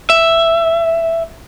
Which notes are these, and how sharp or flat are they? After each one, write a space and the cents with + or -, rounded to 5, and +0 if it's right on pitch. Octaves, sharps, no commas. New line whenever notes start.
E5 +5